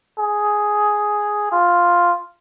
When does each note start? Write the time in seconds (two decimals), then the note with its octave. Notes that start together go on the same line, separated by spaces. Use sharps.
0.20 G#4
1.52 F4